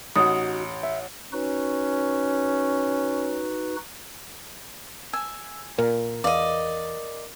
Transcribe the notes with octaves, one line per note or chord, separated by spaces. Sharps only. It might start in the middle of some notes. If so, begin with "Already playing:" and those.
A1 D#4 F#4 D#6
E5
C#4 D#4 F#4 B4
G#5 E6
A#2 A#4
E2 B4 D5 D#5 F5